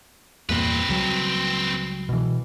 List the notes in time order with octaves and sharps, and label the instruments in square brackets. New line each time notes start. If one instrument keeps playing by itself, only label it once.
[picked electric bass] E2 G2 A#2 [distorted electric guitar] C4 B4
[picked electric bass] C#2 F#3 G3
B2 E3